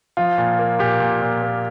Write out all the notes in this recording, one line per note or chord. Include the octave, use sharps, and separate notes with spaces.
F3 F4
A#2
A#3
A#2 G4
A#2
A#2
A#3